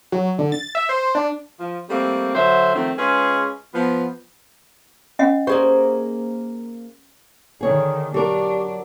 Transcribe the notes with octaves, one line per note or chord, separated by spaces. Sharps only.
F#3
D3
A6
E5
C5
D4
F3
G3 A3 A#3 C4
D3 F#3 C5 E5
D#3 F3 A3 C4
G#3 C#4 F4 G#4 B4
F3 B3
C#4 D#5 F#5
A#3 G4 G#4 C5
D3 D#3 G#4 C#5
F#3 D4 G4 A#4